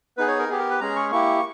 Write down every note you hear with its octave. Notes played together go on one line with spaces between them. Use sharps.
B3 D#4 G#4 B4
C#5
A#4
B3 G4 G#4
A#4
B4
G#3 C#4 G#4 A#5
C#6
A#3 E4 G4 C#6